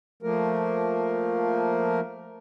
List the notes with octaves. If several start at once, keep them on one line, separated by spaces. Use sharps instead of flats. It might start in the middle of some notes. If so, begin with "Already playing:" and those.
F3 A3 A#3 A#4